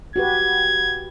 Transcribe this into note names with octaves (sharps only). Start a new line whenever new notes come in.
F#4 G4 B4 G#6